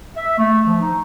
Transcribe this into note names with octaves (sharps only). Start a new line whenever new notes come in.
E5
A3
F3
D#4